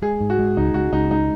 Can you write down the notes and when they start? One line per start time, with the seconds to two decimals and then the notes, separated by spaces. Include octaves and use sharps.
0.02 G#3 G#4
0.20 G#2
0.30 F#4
0.39 G#3
0.57 C#2 D#4
0.74 C#2 F#4
0.93 C#2 D#4
1.11 G#3 D#4